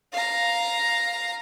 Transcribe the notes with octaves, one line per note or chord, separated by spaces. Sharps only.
F5 A#5